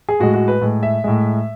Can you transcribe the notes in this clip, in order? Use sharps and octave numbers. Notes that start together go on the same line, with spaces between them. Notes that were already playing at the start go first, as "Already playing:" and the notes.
G#4
A2 G#3 F#4
F#4
B4
A2 G#3
E5
A2 G#3